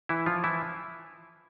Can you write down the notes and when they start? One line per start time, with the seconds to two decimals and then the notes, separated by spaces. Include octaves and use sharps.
0.09 E3 E4
0.26 F3 F4
0.44 E3 E4